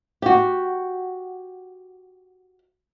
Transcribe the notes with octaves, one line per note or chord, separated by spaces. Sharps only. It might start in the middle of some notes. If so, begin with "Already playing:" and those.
F#4 G4